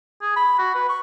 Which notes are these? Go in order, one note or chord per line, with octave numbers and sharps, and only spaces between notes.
G#4
B5
F#4
B4
C#6